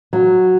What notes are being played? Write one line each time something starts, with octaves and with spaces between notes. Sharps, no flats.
F#3